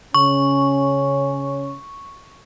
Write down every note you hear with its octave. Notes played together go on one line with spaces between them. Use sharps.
C#3 C#4 C#6